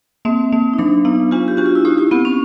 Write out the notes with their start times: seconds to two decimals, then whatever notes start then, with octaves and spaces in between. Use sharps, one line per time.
0.25 A#3 C4
0.52 A#3
0.73 D#4
0.79 F#3 D4
1.05 B3 D#4
1.31 D4 F4
1.48 G4
1.57 D4 F#4
1.66 F4
1.75 E4
1.85 D#4 G4
1.98 E4
2.11 B3 C4
2.25 C#4